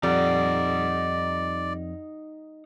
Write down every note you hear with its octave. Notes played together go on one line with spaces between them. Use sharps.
F2 G3 D#4 D5 F#5